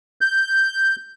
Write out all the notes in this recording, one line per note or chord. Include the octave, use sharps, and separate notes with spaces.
G6